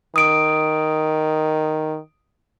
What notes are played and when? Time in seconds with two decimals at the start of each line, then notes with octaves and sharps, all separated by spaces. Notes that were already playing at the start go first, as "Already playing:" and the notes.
0.16 D#3 D#6 D7